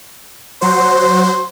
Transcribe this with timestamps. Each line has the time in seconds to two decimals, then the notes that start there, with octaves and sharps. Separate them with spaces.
0.61 F#3 F#4 C5 C6